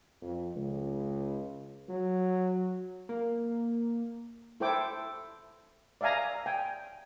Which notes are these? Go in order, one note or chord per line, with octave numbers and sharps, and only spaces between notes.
F2
C#2
F#3
A#3
E4 A4 C5 G5 D6
D5 E5 F5 G#5 A#5
G5 G#5